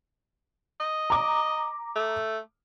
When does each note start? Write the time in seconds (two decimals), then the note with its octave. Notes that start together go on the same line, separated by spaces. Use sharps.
0.80 D#5
1.10 A#5 D6
1.96 A3